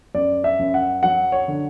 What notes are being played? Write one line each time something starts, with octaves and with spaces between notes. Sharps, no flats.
F#2 D5
E5
F#2
F#5
F#3 F#5
C#5
D3